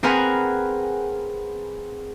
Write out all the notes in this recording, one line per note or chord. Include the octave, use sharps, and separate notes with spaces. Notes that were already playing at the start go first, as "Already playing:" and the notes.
C4 G#4 A#4 B4 F#5 G#5